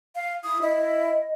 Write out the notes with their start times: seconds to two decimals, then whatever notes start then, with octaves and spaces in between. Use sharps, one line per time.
0.15 F5
0.44 E4 D#6
0.62 E4 D#5